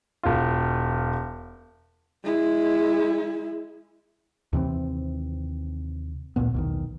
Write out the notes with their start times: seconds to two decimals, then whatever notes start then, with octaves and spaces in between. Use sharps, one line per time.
0.23 E1 F4
2.24 G#3 E4
4.53 D#2 C3 E3 C4
6.36 A1 D2 A#2 B3
6.54 B1 E2 D#3